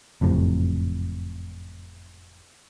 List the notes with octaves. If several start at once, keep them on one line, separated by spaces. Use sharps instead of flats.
F#1 F2 A2 C3